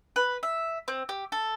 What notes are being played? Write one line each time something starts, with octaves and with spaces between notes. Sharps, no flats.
B4
E5
C4
G4
A4